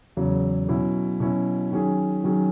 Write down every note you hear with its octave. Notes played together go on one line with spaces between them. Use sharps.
E2 C#3 F#3
B2 F#3 C#4 E4
B2 F#3 C#4 E4
D#3 F#3 C#4 G#4
D#3 F#3 C#4 G#4